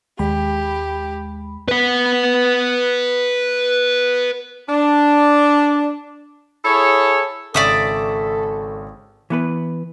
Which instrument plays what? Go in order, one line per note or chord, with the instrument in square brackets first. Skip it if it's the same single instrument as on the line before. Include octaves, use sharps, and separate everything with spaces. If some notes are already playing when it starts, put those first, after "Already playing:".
[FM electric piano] D#2 G#3 B5 [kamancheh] G4
[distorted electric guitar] B4 F#5
[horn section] D4
E4 G#4 A4 C#5
[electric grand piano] G#1 C#3 C#6 [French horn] A4 [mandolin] D5 E5 D#6
[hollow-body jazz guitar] E3 B3 B4